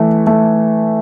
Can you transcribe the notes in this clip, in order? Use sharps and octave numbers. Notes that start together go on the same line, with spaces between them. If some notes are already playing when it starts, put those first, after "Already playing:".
Already playing: E3 A3
A3